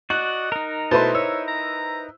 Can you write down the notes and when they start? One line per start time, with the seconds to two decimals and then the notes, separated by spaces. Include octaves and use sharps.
0.10 F#4 D5 D#5 F#6
0.52 D#4 A#4
0.91 B2 A3 E4 B4 C5 A5 C6
1.15 C#5 E6
1.48 A#5